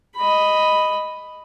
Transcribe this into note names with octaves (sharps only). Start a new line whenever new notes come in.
D#5 B5